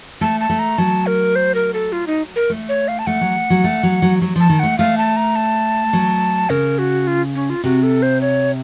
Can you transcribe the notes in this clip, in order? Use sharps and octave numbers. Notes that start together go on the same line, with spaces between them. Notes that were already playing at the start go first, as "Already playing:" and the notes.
A3 A5
A5
A3
A#5
F#3 A5
A#4
C5
A#4
A4
F4
D#4
A#4
A3
C#5
F5
A5
A3 F#5
F#3
F#3
A3
F#3
F#3
F#3
F3 A5
D#3
A3 F#5
A3 F5
A5
A#5
A5
F#3
C#3 A#4
F#4
F4
C#4
F4
C3 F#4
A4
C5
C#5